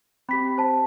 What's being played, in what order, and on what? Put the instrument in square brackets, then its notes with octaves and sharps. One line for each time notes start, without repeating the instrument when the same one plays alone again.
[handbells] C4 G4 [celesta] B5 B6
[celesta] C5 A5